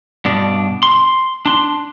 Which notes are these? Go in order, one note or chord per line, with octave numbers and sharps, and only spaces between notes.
G2 B2 D4
C6
D4 C6